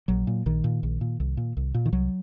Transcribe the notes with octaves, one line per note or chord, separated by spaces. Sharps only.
A#1 F#3
A#2
A#1 D#3
A#2
A#1
A#2
C2
A#2
C2
A#2
D#3
C2 F#3